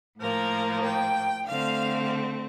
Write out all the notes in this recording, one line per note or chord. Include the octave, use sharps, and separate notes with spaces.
A2 F3 A#3 A#4
G5
D3 A3 C4 F5